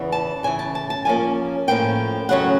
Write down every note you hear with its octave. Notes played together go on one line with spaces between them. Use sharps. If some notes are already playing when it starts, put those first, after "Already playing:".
Already playing: E2 C#3 E3
A5
E2 C#3 E3 G#5
A5
A5
A5
A2 F3 A#3 C#4 G#5
A2 F3 A#3 C#4 G5
E2 C#3 F#3 A3 C#4 F#5